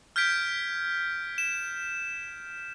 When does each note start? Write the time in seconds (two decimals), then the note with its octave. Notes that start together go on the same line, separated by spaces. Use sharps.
0.16 F6 G6 G#6 B6 D7
1.38 E7